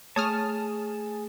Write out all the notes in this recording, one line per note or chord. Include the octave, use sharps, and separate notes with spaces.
A3 G#4 C#5 A5 D#6 F6